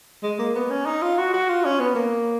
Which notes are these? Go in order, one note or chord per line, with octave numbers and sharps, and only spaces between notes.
G#3
A#3
B3
C#4
D#4
F4
F#4
F#4
F4
C#4
B3
A#3